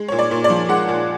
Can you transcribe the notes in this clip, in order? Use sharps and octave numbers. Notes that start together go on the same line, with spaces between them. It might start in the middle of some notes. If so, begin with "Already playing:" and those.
Already playing: G#3
A#2 C#5
D5
A#2
D5
F3
G#3 F#5
A#2